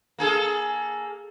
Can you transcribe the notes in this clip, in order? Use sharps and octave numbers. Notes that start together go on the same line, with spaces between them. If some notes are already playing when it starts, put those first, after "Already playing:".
A#3 G#4 A4